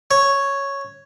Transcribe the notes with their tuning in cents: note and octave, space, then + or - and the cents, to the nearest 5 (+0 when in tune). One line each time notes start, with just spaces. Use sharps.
C#5 +0